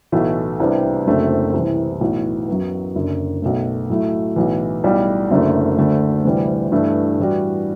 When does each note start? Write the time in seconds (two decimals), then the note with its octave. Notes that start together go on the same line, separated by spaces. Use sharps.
0.12 B1 A2 E3 A3
0.60 C2 C3 G3 B3 D4
1.06 F#1 F#2 D3 A3 C4
1.53 C2 C3 E3
2.01 B1 A2 E3
2.48 F#2 F#3 B3
2.95 F#1 F#2 D3
3.42 B1 B2 A3
3.89 A2 F#3 A3 E4
4.36 B1 A2 E3
4.84 B1 A2 G3
5.30 F#1 F#2 D3 A3
5.78 D2 D3 A3
6.25 D2 C3 E3 G3
6.72 G2 E3 A3 E4
7.19 A2 E3 G3 D4 F#4